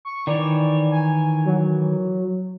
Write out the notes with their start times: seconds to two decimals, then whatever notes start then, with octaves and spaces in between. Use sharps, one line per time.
0.05 C#6
0.27 D#3 E3 C#5 D5
0.91 G#5
1.45 F#3